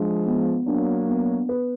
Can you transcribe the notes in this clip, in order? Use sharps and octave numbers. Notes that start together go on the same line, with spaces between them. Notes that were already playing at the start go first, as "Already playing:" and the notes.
Already playing: F3 G#3 D4
B3
F#3 A#3 D4
B3
B4